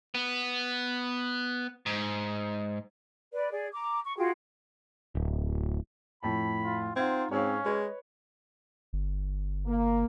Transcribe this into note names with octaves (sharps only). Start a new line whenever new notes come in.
B3
G#2
B4 D5
G#4 D5
A#5 D6
C#6
F4 F#4 G#4 G5
D1
F2 A2 A5 B5
F4
C4 D#4 F4 F#5 G#6
G#2 C4 C#4 C#5 F5
G#3 B4 C#5 D#5
G1
A#3